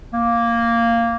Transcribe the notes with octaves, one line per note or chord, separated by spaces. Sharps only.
A#3